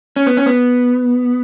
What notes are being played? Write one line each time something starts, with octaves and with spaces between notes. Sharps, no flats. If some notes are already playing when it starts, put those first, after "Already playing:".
C#4
B3
C#4
B3